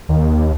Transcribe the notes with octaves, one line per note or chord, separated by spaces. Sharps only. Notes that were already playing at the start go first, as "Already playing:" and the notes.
D#2